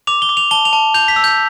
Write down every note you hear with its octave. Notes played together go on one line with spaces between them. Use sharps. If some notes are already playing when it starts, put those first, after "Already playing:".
D6 F7
G7
D6
F7
A5 G7
F7
A5
G6 F7
B6
E6
G6